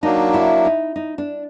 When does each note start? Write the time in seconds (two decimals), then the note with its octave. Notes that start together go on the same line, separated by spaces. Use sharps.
0.03 F#3 A#3 D4 D#4
0.34 E4
0.65 D#4
0.96 D#4
1.18 D4